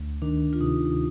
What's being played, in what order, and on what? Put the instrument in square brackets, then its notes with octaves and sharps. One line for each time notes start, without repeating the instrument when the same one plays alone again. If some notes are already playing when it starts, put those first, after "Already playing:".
Already playing: [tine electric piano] D2
[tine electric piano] D#3 [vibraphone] D4
[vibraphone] F4
[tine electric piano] C3 [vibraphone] D#4